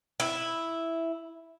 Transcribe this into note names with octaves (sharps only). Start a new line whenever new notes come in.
E4